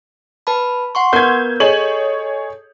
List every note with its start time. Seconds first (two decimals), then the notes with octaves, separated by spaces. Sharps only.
0.47 B4 A5 B5
0.95 F#5 C6 C#6
1.13 B3 A#4 B4 G6 G#6
1.60 G#4 A4 C#5 D#5 F#7